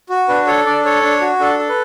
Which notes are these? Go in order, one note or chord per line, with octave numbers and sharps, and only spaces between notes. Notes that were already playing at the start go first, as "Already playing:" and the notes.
F#4
D4 B4
A4 C#5
D4 D5
A4 C#5
D4
F#4
D4 A4
A4
B4